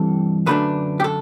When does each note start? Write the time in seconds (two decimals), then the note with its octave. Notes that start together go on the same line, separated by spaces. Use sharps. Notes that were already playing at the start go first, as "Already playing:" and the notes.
Already playing: G2 E3 G3 C4 A4
0.46 F#2 D3 A3 D4 B4
1.00 G4
1.04 A4